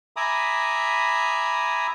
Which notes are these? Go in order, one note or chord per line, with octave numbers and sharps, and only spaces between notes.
E5 G#5 A#5 B5 D6 D#6